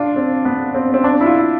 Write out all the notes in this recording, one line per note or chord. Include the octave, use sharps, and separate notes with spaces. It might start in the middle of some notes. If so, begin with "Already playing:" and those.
Already playing: D4 F4
C4
B3
C4
C4
D4
E4
F4